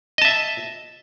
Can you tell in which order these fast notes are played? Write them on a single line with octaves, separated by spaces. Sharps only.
D#5 A5 E5